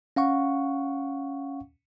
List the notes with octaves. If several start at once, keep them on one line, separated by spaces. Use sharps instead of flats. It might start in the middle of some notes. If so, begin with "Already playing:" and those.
C#4 F5 F#5 C#6